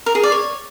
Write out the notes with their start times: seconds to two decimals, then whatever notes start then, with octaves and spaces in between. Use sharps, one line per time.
0.06 A#4
0.15 G#4
0.23 D5
0.32 C#5